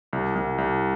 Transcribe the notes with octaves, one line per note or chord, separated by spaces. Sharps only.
C2
C2
C2